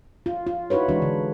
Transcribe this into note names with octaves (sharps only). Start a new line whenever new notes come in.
F4
F4
D#4 E4 F#4 B4 C#5
E3 G#3 D4 F#4
D3